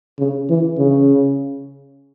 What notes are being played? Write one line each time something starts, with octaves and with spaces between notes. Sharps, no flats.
C#3
E3
C#3